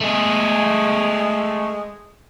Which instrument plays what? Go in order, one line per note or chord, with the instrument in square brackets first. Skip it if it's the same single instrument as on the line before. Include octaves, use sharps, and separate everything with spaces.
[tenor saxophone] G#3 [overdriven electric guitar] A3 G#4